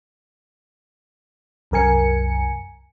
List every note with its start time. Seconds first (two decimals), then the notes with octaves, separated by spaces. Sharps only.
1.71 C2 F#2 A#4 G#5 C#7